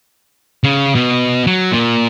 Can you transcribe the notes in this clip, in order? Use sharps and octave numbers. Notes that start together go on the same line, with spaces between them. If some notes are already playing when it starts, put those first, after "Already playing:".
C#3
B2
F#3
A#2